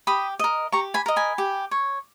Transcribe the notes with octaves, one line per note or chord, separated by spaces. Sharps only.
G4 B5 D#6
A#4 D#5
G4 A#5 C#6
G#5 B5
A#4 D#5
G#5 B5
G4
C#5